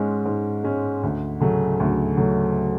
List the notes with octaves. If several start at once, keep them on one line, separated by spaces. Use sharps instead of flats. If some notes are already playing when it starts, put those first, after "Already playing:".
Already playing: G#2 G#3 C#4
G#2
G#3 C#4
D2
C#3 F#3 A3
D2
C#3 F#3 A3